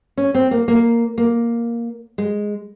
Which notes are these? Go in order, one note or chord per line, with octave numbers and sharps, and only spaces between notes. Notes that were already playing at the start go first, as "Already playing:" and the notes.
C#4
C4
A#3
A#3
A#3
G#3